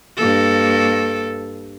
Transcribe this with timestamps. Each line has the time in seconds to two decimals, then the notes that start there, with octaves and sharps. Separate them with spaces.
0.17 G2 A#3 A4